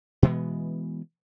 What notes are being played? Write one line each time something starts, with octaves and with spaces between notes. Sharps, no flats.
B2 E3 G#3 B3